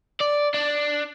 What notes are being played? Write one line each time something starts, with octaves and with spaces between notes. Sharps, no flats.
D5
D4